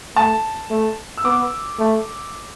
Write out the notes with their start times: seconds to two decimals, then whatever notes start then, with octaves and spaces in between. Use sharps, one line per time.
0.16 A3 A5
0.70 A3
1.17 E6
1.25 B3 D6
1.79 A3